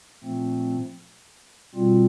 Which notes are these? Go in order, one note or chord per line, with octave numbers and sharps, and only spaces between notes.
A#2 F3 A3 C4
B2 G3 C4 F4